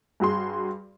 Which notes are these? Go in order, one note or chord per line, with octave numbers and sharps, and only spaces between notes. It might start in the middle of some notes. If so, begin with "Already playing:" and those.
G2 F#4 G#4 C6